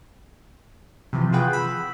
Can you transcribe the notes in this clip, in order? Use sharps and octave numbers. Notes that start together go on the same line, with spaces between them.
C3 E3 F3
F4 F#4 G#4 B4 G5
B5 E6